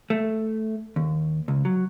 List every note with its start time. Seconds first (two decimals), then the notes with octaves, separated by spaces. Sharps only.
0.10 A3
0.96 D#2
1.48 C#2
1.65 F#3